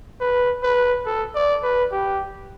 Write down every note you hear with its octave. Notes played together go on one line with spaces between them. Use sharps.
B4
B4
A4
D5
B4
G4